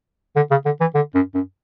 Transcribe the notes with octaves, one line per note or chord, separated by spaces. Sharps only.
D3
C#3
D3
E3
D3
F#2
F#2